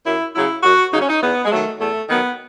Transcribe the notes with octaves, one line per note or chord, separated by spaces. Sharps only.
F#2 E4
C#3 F#3 E4
F#2 F#4
C#3 F#3 D#4
C#4
D#4
E2 B3
G#3
D#3 F#3 A3
E2 A3
D#3 F#3 B3